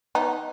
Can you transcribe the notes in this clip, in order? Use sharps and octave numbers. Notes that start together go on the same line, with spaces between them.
B3 D#4